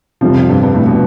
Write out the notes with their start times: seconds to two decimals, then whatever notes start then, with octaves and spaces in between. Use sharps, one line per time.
0.21 F2 C3 F3 G3
0.36 F3
0.49 G2
0.63 G2
0.74 A2
0.85 B2